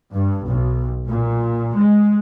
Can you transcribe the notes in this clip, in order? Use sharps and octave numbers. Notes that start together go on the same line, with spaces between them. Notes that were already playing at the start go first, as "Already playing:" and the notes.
G2
B1
A#2
G#3